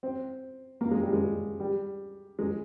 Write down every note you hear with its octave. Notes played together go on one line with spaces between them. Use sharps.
C4
A#3
G#3
G3
G#3
G3
G#3